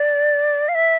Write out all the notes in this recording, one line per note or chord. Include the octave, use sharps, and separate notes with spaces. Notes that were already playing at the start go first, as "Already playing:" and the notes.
Already playing: D5
F5
E5